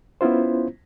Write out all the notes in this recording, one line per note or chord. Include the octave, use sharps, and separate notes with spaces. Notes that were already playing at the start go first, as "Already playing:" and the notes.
B3 C#4 E4 F4 C5